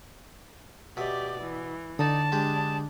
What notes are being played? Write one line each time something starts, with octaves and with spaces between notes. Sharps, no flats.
B2 G4 D5 E5
E3
D3 D#4 D5 A5 D#6
G#3 D4 G4 G#4